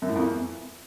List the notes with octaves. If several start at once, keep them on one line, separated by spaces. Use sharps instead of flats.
F#2
A2
F2
E2